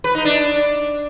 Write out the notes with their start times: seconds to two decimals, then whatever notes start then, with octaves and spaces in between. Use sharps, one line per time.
0.04 B4
0.15 D#4
0.25 D4